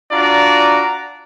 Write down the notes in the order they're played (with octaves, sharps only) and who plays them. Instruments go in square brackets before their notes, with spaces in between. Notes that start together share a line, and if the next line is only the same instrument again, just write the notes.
[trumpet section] D4 F4 F#4 D5 A#5